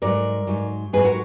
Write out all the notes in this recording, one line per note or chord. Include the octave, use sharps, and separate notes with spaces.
G#2 F#3 A#4 D5
G#2 F#3
G#2 F#3 G#4 B4
F#4 A#4